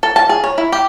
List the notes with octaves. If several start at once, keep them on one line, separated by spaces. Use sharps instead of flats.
A4
A5
G#4
C#5
E4
G4